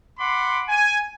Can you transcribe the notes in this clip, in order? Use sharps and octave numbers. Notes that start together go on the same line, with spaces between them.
F#5 B5 C6 D6
G#5